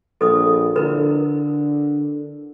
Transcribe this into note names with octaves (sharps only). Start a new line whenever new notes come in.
A#1 A4 B4 D#6
D3 E4 A#4 B4